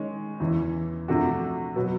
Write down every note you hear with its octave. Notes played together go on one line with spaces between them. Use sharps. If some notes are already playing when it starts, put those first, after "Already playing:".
Already playing: D#3 G#3 C#4
E2 C#3 E3
C3 F3 A3 D4 F#4
B2 F#3 B3